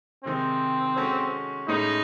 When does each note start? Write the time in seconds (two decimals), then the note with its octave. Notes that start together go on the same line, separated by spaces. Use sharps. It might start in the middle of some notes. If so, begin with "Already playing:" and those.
0.25 C3 D#3 G#3 C4 D#4
0.96 G#3 C#4 F#4 A4 C5
1.68 A2 G#3 C#4 D#4 G#4 C5